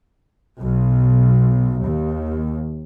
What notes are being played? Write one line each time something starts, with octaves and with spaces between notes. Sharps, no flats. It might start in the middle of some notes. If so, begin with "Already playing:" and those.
B1
D#2